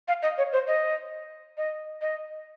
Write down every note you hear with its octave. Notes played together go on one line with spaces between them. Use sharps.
F5
D#5
C#5
C5
D#5
D#5
D#5